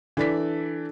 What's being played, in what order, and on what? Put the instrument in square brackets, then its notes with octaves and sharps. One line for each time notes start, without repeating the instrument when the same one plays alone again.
[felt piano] E3 D5 B6 [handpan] D4 A4